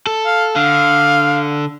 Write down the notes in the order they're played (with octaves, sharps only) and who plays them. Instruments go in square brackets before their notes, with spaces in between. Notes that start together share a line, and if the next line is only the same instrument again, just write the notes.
[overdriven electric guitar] A4
[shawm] F5
[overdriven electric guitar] D3 [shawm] F5